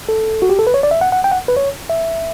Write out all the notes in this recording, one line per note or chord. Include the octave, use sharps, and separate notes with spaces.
A4
F#4
G4
A4
B4
C#5
D5
E5
F#5
F#5
G5
F#5
B4
C#5
E5